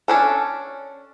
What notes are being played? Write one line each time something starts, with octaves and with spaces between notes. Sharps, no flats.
C#4 D4 A4